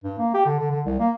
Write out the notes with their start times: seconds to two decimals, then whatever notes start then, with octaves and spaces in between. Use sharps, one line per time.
0.04 G2
0.19 A#3
0.34 G4
0.46 D3
0.59 D3
0.71 D3
0.86 C2
1.00 A#3